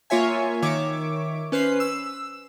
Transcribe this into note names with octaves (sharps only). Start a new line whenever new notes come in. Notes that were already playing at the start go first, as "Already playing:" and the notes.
A#3 F4 C#5 E5 G#5
D#3 C#5 E5 D6
C#4 B4 C5 C7
E6